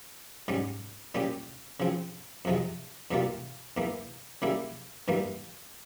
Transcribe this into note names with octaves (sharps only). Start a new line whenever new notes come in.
G#2 G3 C#4
A#2 G3 C#4 G4
C#3 F3 C4
F2 C3 F3 G#3
E2 C3 G3 A#3 F4
E2 E3 A#3
C#3 G3 A#3 E4
G2 E3 G3 A#3